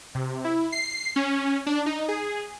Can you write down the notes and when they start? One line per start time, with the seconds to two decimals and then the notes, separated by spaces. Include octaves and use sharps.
0.15 C3
0.45 E4
0.72 C7
1.16 C#4
1.67 D4
1.86 D#4
2.08 G#4